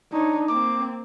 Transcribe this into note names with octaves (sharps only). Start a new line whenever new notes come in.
D4 D#4 C#5
A#3 C4 D6